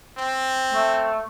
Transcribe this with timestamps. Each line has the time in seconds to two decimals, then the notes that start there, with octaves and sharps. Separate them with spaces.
0.17 C4
0.73 A3